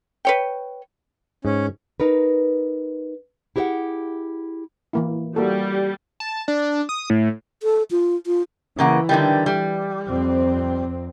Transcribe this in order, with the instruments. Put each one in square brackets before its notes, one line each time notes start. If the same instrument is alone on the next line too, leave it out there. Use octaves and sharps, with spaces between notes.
[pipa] B4 C#5 G5
[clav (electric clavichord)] G#2 [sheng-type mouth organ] C#4
[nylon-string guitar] D#4 A#4 B4
E4 G4 G#4 C5 E5 F#5
[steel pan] E3 A#3 E4
[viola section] G3 [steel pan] A#3 F#4 A4
[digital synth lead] A5
D4
D#6
A2
[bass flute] A4
F4
F4
[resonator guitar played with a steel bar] C#3 A#3 F#5 [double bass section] E3
[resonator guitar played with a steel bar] D3 D#3 G3
G3
[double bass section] F2 C4